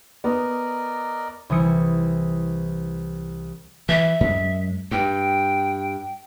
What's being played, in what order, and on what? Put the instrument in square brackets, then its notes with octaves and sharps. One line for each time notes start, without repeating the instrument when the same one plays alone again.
[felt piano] B3 [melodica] A#4 D5 D#5
[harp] C2 E3 D#6 C#7
[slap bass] E3 [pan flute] E5
[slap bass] F#2 G#3
[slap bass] G2 [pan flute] G5